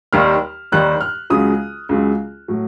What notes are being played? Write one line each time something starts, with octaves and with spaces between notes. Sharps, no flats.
D#2 D#3 G3 F6
D#2 D#3 G3 F#6
F6
C#2 C#3 F#3 D#6
C#2 C#3 F#3
A2 F#3